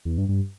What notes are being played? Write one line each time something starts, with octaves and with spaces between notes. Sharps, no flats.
E2
G2
G2